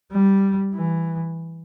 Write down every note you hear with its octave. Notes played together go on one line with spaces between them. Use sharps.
G3
E3